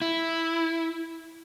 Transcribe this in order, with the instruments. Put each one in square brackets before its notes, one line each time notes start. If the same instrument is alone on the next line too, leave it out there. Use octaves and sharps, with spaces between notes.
[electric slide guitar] E4